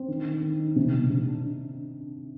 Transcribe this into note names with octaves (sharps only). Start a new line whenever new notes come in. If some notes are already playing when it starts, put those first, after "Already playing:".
Already playing: C4
D#3
D#3
D#3
D#4
C3
C3
C3
D4